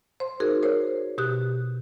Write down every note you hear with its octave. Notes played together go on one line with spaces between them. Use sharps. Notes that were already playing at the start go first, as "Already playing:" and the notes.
C5 C6
D#4 F#4 G#4 A#4
A#4 C5 C#5
B2 G4 D#6 F#6